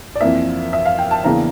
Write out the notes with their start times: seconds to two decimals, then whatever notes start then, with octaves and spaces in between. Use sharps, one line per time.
0.16 D5
0.21 F2 E3 A#3 E5
0.73 E5
0.86 F5
0.99 G5
1.11 A5
1.24 E2 C#3 E3 A#3 D4 A#5